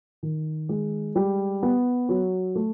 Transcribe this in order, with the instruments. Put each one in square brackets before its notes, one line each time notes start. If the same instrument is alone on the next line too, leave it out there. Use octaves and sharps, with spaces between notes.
[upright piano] D#3
G#3
G3
B3
F#3
A3